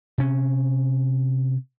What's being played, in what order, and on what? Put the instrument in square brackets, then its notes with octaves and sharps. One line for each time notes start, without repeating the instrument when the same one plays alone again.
[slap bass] C3 C#4